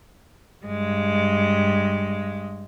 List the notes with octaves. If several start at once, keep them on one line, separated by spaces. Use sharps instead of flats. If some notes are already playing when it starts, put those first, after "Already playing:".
G2 G#3